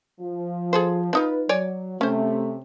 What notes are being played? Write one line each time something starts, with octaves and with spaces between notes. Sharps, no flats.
F3
G#4 A4 C5
D4 D#4 F4 B4
F#3 C#5 D5 G#5
C3 A3 C#4 C5